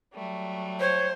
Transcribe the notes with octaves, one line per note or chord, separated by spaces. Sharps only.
F#3 G3 A3
C5 C#5